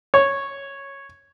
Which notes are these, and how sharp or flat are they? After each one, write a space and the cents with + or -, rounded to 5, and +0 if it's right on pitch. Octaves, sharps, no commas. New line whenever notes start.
C#5 -5